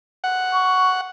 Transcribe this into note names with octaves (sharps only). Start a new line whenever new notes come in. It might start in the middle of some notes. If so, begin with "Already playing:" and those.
F#5
C#6